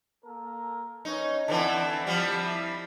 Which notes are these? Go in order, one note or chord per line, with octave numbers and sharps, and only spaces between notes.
A#3 A4 A#4
C#4 D#4 B4 C#5
D3 E3 C4 A5
F3 G3 C4
E4